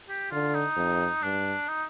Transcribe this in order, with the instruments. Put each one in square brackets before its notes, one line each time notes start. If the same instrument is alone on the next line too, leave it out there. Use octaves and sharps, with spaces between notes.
[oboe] G4
[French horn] D3 [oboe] F4
[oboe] D#4
[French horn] F2
[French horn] G2 [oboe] D4
[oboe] D#4